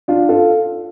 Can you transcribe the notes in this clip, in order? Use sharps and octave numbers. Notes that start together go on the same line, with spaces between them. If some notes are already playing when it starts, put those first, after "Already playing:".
D4 F4
F4 A4